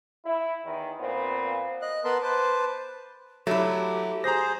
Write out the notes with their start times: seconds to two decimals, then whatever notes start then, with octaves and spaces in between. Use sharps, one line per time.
0.25 E4
0.65 E2 D#3
1.00 A#2 B3 C4
1.82 D#5 F#6
2.04 B3 A#4 B4 A5 B5 C6
2.22 B4 C5 A5 D6
3.47 F#3 A3 E4 G4
4.24 G#4 C5 A#5 A#6